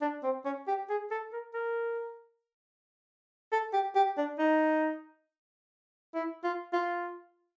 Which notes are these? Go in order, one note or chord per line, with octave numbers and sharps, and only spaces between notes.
D4
C4
C#4
G4
G#4
A4
A#4
A#4
A4
G4
G4
D4
D#4
E4
F4
F4